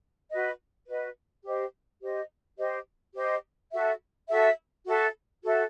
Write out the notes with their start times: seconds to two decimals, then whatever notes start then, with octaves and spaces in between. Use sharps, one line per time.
0.30 F#4 B4 D#5
0.87 F#4 B4 D#5
1.44 G4 C5 D#5
2.01 G4 C5 D#5
2.58 G4 C5 D#5
3.15 G4 C5 D#5
3.72 F#4 A4 E5
4.29 F#4 A4 E5
4.85 F#4 A4 E5
5.42 F#4 A4 E5